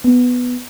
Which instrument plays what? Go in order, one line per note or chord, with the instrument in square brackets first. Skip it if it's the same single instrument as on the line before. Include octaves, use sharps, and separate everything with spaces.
[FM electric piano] B3